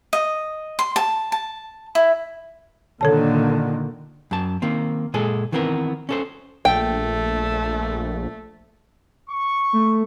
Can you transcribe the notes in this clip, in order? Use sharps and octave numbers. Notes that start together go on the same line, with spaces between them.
D#5
C6
A5
A5
E4
A#2 D3 D#3 A4 C#5 A5
F#2 A5
D#3 A#3 C4
A#2 G#3 G#4 A4
D#3 E3 B3 C4 A4 A#4
C#4 A4 C5
A#1 A3 G5
C#6
A3